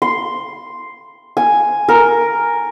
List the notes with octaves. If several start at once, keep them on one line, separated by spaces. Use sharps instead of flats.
C6
G#5
A#4